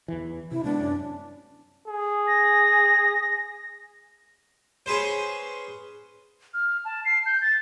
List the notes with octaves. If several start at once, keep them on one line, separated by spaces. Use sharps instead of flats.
E2 E3
C3 E4
C3 G#3 B3 D4
F#2 C#4
G#4
A#6
C#4 G#4 B4 C5
F6
A5
C7
G6
A6